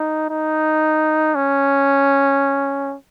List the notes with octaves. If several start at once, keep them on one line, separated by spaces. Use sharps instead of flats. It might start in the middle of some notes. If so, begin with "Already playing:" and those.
Already playing: D#4
D#4
C#4